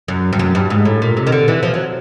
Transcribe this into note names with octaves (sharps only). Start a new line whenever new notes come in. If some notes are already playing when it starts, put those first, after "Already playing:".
F#2
G2
F#2
G2
G#2
A2
A#2
C3
D#3
D3
E3
F3
F#3